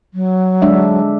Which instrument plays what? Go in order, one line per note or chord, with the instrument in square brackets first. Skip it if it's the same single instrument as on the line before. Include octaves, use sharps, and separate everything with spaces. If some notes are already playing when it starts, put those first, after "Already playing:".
[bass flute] F#3
[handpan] G#3 D4 E5